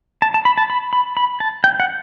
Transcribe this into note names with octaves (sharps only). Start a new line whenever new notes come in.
A5
A5
B5
A5
B5
B5
B5
A5
G5
F#5